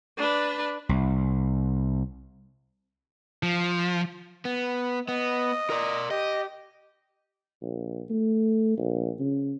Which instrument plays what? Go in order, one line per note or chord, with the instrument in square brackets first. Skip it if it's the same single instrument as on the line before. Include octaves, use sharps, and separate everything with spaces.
[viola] D4 B4
[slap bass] C2
[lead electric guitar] F3
[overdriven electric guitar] B3
[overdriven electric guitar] B3 [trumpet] D#5
[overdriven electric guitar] A#4 D5
[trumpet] G4 [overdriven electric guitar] D#5
[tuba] A#1
A3
A#1
C#3